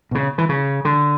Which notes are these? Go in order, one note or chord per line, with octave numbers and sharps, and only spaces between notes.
B2
C#3
E3
C#3
D3